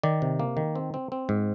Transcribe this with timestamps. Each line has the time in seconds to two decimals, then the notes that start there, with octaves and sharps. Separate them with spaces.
0.03 D#3 D5
0.22 C3
0.40 A#3
0.57 D#3
0.75 C4
0.94 C4
1.12 C4
1.29 G#2